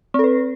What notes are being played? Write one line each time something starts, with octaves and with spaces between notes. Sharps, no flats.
C4 A4 B4